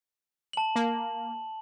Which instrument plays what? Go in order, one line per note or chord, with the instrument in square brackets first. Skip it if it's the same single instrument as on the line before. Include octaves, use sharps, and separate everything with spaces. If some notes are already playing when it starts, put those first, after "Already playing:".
[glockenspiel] A5 F#7
[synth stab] A#3